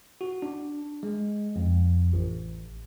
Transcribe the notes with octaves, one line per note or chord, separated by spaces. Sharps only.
F#4
D4
G#3
F2
A1